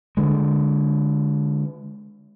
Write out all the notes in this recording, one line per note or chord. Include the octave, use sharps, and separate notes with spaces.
D3 G#3